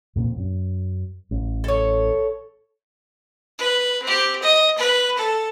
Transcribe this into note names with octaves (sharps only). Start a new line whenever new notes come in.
F2 A#2 C4
F#2
A1
A4 C#5
B4
C4 G4
D#5
B4
A4